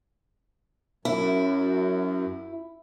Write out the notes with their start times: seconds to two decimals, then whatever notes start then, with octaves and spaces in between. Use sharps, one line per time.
1.05 F#2 E4